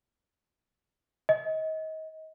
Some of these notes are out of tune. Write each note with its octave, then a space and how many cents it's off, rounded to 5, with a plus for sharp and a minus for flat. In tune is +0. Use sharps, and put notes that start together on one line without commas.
D#5 +30